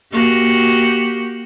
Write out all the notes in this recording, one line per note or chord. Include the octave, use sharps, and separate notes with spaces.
A#3 F#4 G4